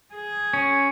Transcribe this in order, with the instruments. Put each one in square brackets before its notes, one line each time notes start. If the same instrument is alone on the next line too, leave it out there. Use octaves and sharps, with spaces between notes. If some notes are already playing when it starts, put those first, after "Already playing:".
[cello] G#4
[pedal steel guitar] C#4